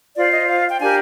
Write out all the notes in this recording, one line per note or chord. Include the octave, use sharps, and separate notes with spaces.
F4 C5 D5
D#5
F5
G5
D4 G4 A#4 G#5